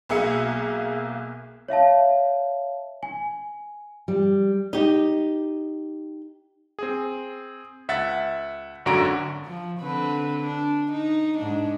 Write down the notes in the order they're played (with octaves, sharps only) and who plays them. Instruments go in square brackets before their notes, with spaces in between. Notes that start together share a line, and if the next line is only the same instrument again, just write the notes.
[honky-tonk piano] B1 A#3 G#4 E5 C#7
[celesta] C#5 E5 F5 A5
G#5
[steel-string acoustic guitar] G3
[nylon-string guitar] D#4 G4
[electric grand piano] C4 G#4
C#2 E5 F#5 A6
G#1 F#2 D3 F#4 A#5 D7
[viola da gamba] F3
D3 C4 B4
D4
D#4
G#2 D4